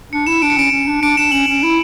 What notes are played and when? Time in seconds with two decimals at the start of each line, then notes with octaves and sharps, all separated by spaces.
0.12 D4 C#7
0.27 E4 E7
0.42 D4 D7
0.50 C#7
0.57 C#4 D7
0.72 C#4
0.87 D4
1.02 D4 D7
1.17 D4 E7
1.32 C#4 F#7
1.48 C#4
1.63 E4